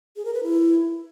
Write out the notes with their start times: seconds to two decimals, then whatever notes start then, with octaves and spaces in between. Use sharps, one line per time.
0.16 G#4
0.25 A#4
0.34 B4
0.43 E4